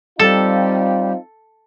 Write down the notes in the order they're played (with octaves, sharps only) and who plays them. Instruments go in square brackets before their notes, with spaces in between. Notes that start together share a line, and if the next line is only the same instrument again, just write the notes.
[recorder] G3 [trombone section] C4 D#4 F4 [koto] A4